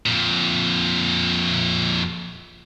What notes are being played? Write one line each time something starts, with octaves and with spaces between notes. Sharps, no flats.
F2 A#2